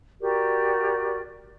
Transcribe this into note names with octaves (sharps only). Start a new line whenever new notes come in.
F#4 G4 A#4 D5